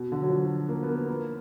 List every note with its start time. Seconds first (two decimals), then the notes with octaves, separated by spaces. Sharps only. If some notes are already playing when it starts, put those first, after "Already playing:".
Already playing: B2
0.12 D3
0.22 F#3
0.30 F3
0.69 A#3
0.83 B3
0.88 A#3
1.08 A#3